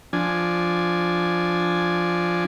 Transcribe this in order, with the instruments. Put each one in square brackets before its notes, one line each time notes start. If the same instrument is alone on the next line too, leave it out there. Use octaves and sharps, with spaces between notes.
[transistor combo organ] F3 D4 G#5